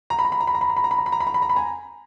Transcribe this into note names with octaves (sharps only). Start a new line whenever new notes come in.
A#5
B5
A#5
B5
A#5
B5
A#5
B5
A#5
B5
A#5
B5
A#5
B5
A#5
B5
A#5
B5
A#5
B5
G#5 A#5